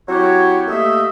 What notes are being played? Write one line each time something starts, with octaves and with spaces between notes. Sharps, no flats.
F#3 C4 E4 F#4 G4 C#5
A3 A#3 G4 D#5 E5